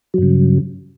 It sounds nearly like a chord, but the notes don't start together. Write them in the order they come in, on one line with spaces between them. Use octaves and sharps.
F#3 G2 C#3